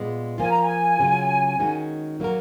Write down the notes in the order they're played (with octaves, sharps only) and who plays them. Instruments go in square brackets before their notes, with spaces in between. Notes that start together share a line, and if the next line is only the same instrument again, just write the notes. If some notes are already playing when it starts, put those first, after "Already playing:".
Already playing: [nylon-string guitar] A#2 G#3 B3
[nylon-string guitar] F3 A#3 F4 [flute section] G#5
[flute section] A#5
G#5
[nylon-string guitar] C#3 F#3 C#4 F4
D#3 G#3 C#4 F#4
F#3 A#3 D#4 F#4 A#4